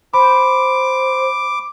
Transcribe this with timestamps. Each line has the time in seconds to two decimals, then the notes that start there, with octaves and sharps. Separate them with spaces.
0.14 C5 B5 D6